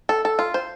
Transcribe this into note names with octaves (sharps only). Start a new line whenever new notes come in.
A4
A4
F4
C5